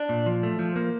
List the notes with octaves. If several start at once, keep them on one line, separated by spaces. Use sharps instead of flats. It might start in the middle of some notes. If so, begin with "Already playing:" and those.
Already playing: D4
A#2
F3
A3
F3
A#3